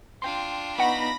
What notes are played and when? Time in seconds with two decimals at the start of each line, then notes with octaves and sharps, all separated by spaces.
0.22 D4 F4 G5 C6
0.78 B3 D#4 F#5 B5 C#6 A#6